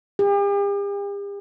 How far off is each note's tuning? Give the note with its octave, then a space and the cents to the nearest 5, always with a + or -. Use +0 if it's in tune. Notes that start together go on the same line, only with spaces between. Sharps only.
G4 +45